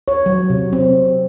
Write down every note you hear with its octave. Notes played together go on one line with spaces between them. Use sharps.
C#5
F#3
C3
C4